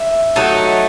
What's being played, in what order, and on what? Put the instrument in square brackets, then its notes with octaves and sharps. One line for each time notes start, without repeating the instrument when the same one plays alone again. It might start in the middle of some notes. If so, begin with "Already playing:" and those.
Already playing: [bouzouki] E5
F#3 A3 D#4